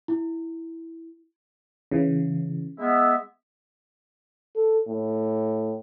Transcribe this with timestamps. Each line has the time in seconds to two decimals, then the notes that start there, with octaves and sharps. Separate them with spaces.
0.08 E4
1.91 C#3 E3
2.79 G#3 B3 E5
4.56 A4
4.89 A2